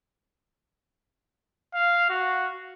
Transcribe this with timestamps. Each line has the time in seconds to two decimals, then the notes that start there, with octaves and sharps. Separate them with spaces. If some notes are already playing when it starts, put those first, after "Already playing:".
1.74 F5
2.10 F#4